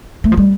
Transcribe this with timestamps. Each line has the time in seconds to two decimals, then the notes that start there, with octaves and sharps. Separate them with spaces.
0.24 A3
0.32 F3
0.37 G3